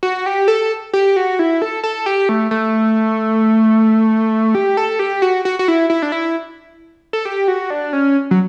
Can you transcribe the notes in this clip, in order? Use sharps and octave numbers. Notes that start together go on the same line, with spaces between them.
F#4
G4
A4
G4
F#4
E4
A4
A4
G4
A3
A3
G4
A4
G4
F#4
F#4
F#4
E4
E4
D4
E4
A4
G4
F#4
D4
C#4
F#3